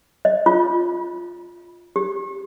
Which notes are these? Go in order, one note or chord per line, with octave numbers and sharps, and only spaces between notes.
D#5
F4
G4